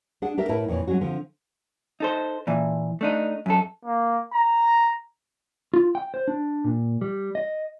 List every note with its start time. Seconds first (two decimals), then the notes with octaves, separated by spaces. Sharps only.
0.22 D4 G#4 F#5
0.38 D4 G4 A#4 E5
0.49 A2 E4 A#4 B4 E5 A5
0.68 F2 A#2 E3 C#5
0.87 F#3 G#3 C#4 F#4
1.01 D3 F3 C4
2.00 D#4 A4 C5
2.47 A#2 E3
3.01 A3 D4 D#4
3.46 F#2 A4
3.85 A#3
4.33 A#5
5.74 F4
5.95 G5
6.14 C5
6.28 D4
6.64 A#2
7.01 G3
7.35 D#5